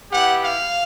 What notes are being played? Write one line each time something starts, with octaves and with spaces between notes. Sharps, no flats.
B3 E4 G4 F#5
F5